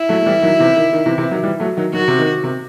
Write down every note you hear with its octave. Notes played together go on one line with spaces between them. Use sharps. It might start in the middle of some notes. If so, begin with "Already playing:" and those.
Already playing: E4
F#3 A3
A3
E3 G3
D#3 F#3
C3 E3
D#3
D#3
C3 E3
C3 E3
D#3 F#3
E3 G3
F#3 A3
D#3 F#3
D#3 F#3 F#4
C3
D#3
C3